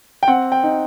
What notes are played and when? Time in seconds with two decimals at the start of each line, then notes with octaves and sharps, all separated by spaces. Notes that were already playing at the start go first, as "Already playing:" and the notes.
0.23 G5
0.28 C4 F#5
0.52 G5
0.63 D#4